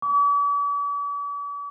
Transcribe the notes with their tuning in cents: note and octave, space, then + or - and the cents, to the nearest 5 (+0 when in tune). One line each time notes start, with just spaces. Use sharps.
D6 -45